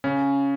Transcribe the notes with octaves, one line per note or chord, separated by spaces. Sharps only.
C#3 C#4